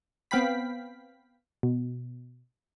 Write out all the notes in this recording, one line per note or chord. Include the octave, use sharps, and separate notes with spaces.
B3 C4 F5 G5 B5 B6
B2